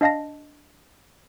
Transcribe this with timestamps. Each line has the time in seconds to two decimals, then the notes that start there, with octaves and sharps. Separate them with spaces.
0.01 D4 D#5 F5 A5 A#6